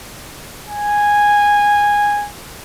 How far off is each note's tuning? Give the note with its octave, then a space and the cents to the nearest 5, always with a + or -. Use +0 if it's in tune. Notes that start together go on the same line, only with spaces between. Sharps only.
G#5 -10